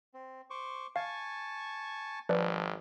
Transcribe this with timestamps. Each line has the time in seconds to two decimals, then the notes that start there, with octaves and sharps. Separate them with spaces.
0.14 C4
0.50 C5 C#6 D6
0.96 F5 G#5 A5 C#6
2.29 G#1 F3 B4 D5